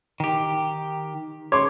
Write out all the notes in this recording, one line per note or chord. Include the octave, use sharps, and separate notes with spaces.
D#3 G4
C#5 C6 D6